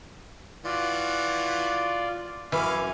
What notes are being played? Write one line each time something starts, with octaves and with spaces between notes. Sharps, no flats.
E3 F4 F#4 D5
F#2 E3 C#4 F5 G#5 D6